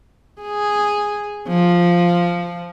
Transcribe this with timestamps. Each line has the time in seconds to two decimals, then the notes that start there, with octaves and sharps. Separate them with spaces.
0.41 G#4
1.48 F3